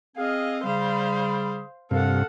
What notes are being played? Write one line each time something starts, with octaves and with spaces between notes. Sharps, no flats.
C4 G#4 D#5 F5
C#3 G3 C5 F5
G2 C3 A4 A#4 F5 F#5